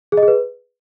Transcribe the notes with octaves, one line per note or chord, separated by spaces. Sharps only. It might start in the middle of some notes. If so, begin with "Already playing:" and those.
G#4
D#5
G#4
B4